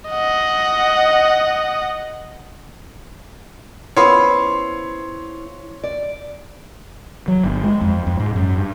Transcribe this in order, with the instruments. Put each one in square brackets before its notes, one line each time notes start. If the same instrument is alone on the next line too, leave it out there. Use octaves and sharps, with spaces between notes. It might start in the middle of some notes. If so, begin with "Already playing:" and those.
[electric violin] D#5 F#5
[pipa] C#3 B3 [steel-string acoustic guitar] E4 F4 C5 [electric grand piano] C#5 C6
[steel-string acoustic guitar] D5
[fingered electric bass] F#3
G1
G#3
F2
F2
G#2
F#2
G2